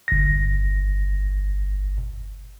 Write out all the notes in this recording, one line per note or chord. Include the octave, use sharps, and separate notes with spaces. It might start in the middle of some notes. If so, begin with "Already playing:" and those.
G1 A#6